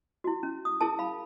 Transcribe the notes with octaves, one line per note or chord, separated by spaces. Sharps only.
E4 F#4
C#4
D#6
E4 G#4 A#4 A5
F5 B5